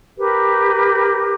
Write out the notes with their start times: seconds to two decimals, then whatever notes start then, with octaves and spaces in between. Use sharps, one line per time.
0.17 G4 A#4 B4